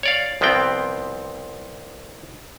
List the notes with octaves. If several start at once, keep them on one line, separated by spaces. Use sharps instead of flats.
C#5 D5 F5
C2 F3 B3 C4 G5